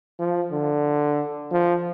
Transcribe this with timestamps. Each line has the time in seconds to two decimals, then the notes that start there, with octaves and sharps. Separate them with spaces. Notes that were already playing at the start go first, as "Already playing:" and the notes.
0.19 F3
0.52 D3
1.52 F3